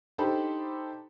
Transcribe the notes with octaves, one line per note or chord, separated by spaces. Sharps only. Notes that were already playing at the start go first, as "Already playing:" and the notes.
D4 D#4 G4 A4 C5 B5